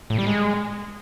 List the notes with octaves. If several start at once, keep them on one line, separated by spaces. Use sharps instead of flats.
A2
G3
G#3